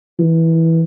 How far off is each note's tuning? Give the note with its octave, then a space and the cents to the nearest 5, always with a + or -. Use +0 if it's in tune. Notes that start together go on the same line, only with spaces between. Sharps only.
E3 -10